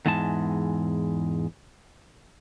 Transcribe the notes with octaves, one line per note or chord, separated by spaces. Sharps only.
E2 G#2 E3 G#3 A5